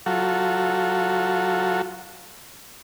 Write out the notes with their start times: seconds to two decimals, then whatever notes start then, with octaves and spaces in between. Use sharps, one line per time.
0.06 F#3 F4 F#4 A4